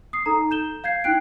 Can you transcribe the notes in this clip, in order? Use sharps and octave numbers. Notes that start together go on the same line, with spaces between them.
D#6 C7
D#4 A4 A#5
G6 E7 G7
F5 G6 G#6 C7
D#4 E4 G5 F#6 C7 D7